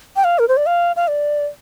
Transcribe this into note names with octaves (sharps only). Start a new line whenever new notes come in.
G5
F5
A#4
C5
D5
F5
F5
D5